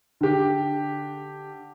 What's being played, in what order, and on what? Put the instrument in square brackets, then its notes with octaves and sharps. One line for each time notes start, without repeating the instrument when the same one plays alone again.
[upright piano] D3 G4